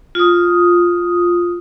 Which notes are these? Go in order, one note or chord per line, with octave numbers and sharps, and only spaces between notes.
F4 D#6